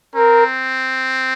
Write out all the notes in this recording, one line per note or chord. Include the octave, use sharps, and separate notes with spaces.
C4 A#4